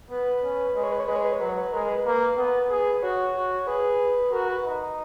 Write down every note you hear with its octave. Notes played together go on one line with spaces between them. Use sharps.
B3 B4
C#4
G#3 B4
C#5
B4
C#5
G#3 B4
C#5
B4
C#5
F#3 B4
C#5
B4
G#3 A#4
B4
A#3 B4
B3 B4
G#4
F#4 C#5
F#4
G#4 B4
F#4 A#4
B4
D#4